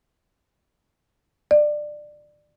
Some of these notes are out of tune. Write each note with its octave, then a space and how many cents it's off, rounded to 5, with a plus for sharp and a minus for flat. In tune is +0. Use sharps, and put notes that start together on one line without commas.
D5 +20